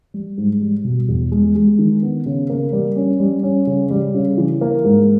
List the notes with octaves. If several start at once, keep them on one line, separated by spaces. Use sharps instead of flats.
G3
G#2
G3
B2
E2
G#3
G#3
D#3
B3
C#3
A#3
G3
C#4
G3
C#4
C#3
G3
C#3
E3
A#3
G#2